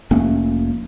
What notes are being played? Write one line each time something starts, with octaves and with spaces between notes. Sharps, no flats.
F1 A3 A#3 C#4